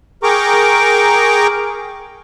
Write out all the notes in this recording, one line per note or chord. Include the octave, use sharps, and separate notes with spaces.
G#4 A#4 G5 A#5 C#6 D6